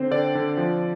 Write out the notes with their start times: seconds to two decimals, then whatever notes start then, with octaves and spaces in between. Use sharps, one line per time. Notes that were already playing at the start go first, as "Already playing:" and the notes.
Already playing: D3 C4 C5
0.11 D3 D5
0.35 D3
0.58 F3